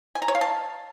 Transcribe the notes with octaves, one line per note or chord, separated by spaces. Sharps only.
G#5
A#5
C#5
F5
A5